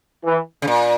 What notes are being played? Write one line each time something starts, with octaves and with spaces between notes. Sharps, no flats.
E3
C#3
A#2